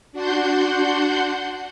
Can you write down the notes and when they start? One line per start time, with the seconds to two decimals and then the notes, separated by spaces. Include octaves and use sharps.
0.12 D4 F#4 F#5 C6 G6